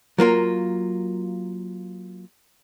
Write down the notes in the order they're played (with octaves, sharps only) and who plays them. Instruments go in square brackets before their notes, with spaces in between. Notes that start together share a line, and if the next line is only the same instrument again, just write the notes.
[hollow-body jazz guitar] F#3 A#3 F4 A#4